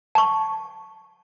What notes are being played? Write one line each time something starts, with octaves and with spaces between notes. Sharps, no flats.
A5 C#6